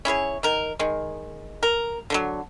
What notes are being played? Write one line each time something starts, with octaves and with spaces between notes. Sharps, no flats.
C#4 E4 G#4 C#5
D#3 A#4
D#3 G#3
A#4
D3 F3 F#3